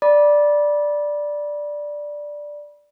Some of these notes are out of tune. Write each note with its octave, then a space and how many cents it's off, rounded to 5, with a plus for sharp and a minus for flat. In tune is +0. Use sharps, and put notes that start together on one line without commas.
D5 +0 B5 -30